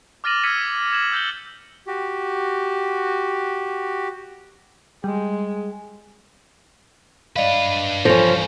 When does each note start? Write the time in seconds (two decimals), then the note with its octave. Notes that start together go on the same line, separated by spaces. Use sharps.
0.24 D6 F6 A6 A#6 D#7 F#7
0.43 E6 F6 G#6 B6 C#7 D#7
0.92 G#6 E7 F#7
1.12 E6 G6 A6 F#7 G7
1.87 F#4 G4
5.04 G3 G#3
7.36 D4 B4 D5 D#5 F5
8.05 G2 E3 F3 C#4 A4 A#6 F7